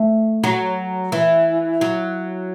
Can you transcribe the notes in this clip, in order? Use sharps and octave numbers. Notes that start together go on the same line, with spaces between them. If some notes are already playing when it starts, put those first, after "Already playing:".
Already playing: A3
F#3
E3
F#3